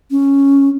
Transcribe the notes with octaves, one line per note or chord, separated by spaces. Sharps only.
C#4